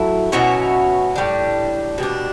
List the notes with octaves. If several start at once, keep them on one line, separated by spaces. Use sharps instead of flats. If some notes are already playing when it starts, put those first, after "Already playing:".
Already playing: F#3 A3 E4 A4
B2 F#3 C#4 E4
A2 G3 D4
B2 G3 D4